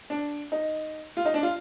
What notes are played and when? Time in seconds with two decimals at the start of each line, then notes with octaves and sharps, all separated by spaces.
0.10 D4
0.52 D#4
1.17 F4
1.25 D#4
1.34 D4
1.43 F4